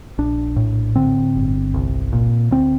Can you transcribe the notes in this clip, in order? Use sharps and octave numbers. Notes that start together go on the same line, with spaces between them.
A#1 D4
A2
D3 C4
G1
C2
A#2
D2 C4